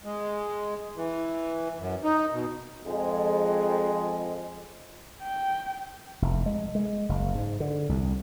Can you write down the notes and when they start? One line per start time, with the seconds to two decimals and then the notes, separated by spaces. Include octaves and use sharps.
0.04 G#3
0.96 E3
1.79 F#2
2.04 D#4
2.33 B2
2.87 F2 G#3
5.22 G5
6.22 F1
6.46 G#3
6.75 G#3
7.09 F#1
7.35 G#2
7.60 D3
7.89 C2